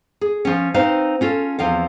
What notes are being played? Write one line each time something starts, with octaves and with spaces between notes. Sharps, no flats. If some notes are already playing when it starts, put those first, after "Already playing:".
G#4
F3 C#4
C4 D#4 B4 C5 F5
C#4 F4 A4
E2 F3 C4 F5